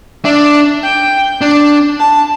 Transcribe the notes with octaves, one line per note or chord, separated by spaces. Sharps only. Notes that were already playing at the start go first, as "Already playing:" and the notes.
D4 E5
G5
D4
A5